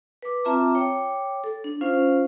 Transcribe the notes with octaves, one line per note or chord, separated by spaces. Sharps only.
B4 D6
C4 F4 E5 A5 A#5 D6
C#5 G5 D6
A4
D4
C#4 F4 C5 F5